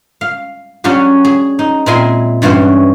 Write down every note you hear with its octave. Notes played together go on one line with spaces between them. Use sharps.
F5
F#3 C#4 D4 F#4 G4
G#4
D#4
A#2 G#3 C4 E4 G#5 C6
G2 E3 C#4 F#4 C5